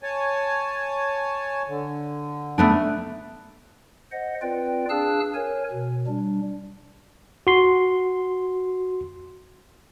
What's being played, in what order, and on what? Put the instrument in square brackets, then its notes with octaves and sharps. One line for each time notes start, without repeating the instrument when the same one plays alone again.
[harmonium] C#5 G#5 A5
D3
[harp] A3 B3 D4
[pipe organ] C5 D#5 F#5
C4 F4 B4 D5 G5
D4 G#4 F5 A5 E6 F#6
A#4 C#5 G#5
B2
G3 D4
[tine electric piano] F#4 C6